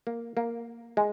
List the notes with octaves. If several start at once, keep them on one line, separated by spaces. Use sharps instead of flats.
A#3
A#3
G#3